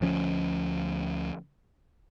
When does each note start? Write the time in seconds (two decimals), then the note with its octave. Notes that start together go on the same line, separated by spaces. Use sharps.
0.01 D2 F3 C#4